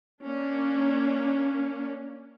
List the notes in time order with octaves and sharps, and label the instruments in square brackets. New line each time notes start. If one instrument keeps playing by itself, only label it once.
[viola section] A#3 C#4 D4